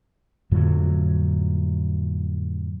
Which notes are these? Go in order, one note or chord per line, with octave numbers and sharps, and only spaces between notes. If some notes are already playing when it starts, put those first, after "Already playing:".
F2 A2 D3 F#3